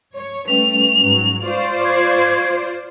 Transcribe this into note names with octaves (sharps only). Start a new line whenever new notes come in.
C#5
G3 A3 C#4 B4 F7
G#2 F#3
F4 C5 D5 F5 C#6
G#6